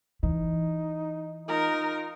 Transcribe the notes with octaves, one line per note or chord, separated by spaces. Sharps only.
E3 D#4
D#4 F4 A#4